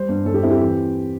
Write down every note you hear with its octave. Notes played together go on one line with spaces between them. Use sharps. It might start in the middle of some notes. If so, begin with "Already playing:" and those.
Already playing: G3 C5
G2
G2 A4
G4
C4 E4
G4
E3